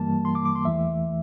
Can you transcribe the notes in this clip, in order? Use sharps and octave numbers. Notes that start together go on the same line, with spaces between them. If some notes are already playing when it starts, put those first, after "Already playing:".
Already playing: G2 E3 G3 A#3 A5
C6
D6
D6
C6
E2 E3 A3 E5